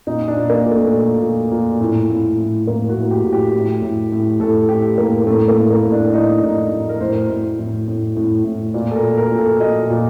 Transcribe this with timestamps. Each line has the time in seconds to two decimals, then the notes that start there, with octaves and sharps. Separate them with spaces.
0.07 A#2 D#4
0.28 D4
0.36 A#2
0.50 A#3
0.65 A#2
0.71 A3
0.94 A#2
1.22 A#2
1.52 A#2
1.81 A2
2.09 A2
2.38 A2
2.67 A2 A#3
2.89 F#4
2.97 A2
3.11 G4
3.24 A2
3.33 G4
3.53 A2
3.82 A2
4.12 A2
4.40 A2 A4
4.69 A2 G4
4.98 A2 A#3
5.27 A2 A3
5.48 A#3
5.56 A2
5.71 A#3
5.85 A2
5.92 D4
6.13 A2 D#4
6.43 A2 D#4
6.72 A2
6.89 A#4
7.01 A2 C5
7.29 A2
7.59 A2
7.88 A2
8.17 A2
8.44 A2
8.74 A#2 D5
8.91 A4
8.96 A#4
9.03 A#2
9.17 A#4
9.32 A#2
9.38 A4
9.60 A#2 D#5
9.90 A#2